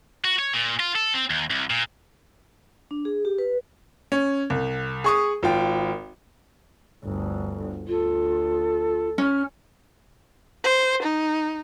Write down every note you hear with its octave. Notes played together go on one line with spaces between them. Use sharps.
F#4
C#5
A#2
F4
A4
C4
D#2
C2
A#2
D4
G#4
G4
B4
C#4
C2
G#4 C#6 D#6
G#1 F4 G5
G1 D2
D2 F4 A4
C#4 F6
C5
D#4